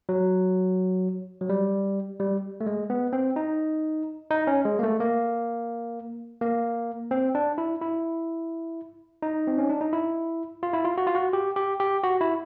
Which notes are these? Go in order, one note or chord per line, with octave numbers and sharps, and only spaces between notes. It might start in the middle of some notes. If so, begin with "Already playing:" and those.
F#3
F#3
G3
G3
A3
G#3
B3
C4
D#4
D#4
C#4
G#3
A#3
A3
A#3
A#3
C4
D4
E4
E4
D#4
C4
C#4
D4
D#4
E4
F4
E4
F4
F#4
F4
F#4
G4
G4
G4
F#4
E4